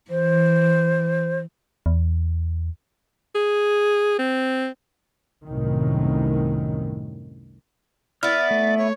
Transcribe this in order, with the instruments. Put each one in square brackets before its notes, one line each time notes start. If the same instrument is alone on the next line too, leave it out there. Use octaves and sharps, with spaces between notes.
[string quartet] E3 [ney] C5
[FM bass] E2
[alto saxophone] G#4
C4
[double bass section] C2 F#2 A2 D#3
[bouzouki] B3 E4 [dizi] D5 [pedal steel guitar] F6
[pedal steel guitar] A3
[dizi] C#5